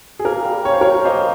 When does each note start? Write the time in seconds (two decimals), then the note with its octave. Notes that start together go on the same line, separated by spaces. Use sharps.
0.19 G#4
0.25 A#3 A#4
0.45 G3
0.65 C#4 C#5
0.73 C5
0.81 G4 A#4 C#5
1.05 A#3 C5 D#5